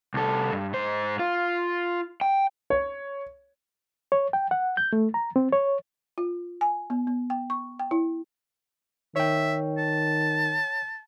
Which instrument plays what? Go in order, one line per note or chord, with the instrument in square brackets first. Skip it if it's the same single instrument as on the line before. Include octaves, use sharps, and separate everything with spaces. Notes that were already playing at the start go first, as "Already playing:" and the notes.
[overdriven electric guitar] C2 A4
G2
G#2 C5
F4
G5
[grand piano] C#5
[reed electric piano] C#5
G5
F#5
G6
A3
A#5
C4
C#5
[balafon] F4
G#5
B3
B3
G5
C#6
G5
E4
[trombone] D#3 [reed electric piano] C#5 G5 [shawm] E5
[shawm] A5